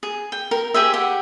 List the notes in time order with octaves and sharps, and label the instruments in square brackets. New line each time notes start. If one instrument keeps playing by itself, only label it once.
[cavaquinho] G#4
G5
A#4
G4 G#4 C5 E5
G4 F#5